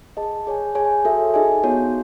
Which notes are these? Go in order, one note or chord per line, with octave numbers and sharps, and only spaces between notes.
G#4 D#5 A5
G#4 C#5 G#5
G#4 C#5 G#5
F#4 A4 E5
D#4 G#4 D#5 G#5
B3 D#4 F#4 C#5